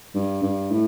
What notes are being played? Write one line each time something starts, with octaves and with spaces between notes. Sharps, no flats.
G2
G2
A2